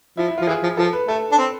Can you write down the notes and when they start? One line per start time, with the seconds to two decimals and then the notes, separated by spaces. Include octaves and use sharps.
0.17 F3 E4
0.28 E4
0.38 F4
0.42 F3
0.47 E3 G#4
0.63 F3
0.77 F3 A4
0.93 B4
1.08 A3 A4
1.32 D4
1.38 C4